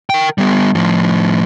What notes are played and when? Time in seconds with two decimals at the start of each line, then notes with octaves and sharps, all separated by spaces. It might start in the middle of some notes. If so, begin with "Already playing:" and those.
0.10 A#4 G5
0.38 G3 B3
0.75 A2 F3